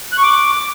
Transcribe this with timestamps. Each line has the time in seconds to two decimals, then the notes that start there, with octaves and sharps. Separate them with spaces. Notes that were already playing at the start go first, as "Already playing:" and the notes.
0.12 F#6
0.18 C#6
0.23 D6